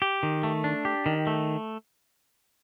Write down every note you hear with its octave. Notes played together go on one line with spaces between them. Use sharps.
G4
D#3
A3
D4
G4
D#3
A3